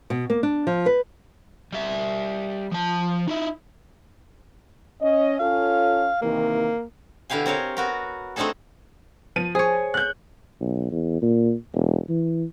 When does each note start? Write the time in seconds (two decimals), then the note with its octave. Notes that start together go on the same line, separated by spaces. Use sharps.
0.10 B2
0.30 A#3
0.43 D4
0.67 F3
0.86 B4
1.72 G3 E5
2.72 F3 A5
3.28 D#4 E4
5.01 C#4 D#5
5.39 C#4 F4 A4 F5
6.22 C3 D#3 E3 A#3
7.30 B2 D3 E4 G4 F5 G#5
7.46 C4 A#4 C#5 F5
7.77 B3 F#4 A#4
8.36 A3 C4 D4 D#4 G#4 A4
9.36 F3 D#7
9.55 G#4 C5 C#5
9.94 F#6 G6
10.61 B1
10.91 E2
11.22 A#2
11.74 E1
12.09 E3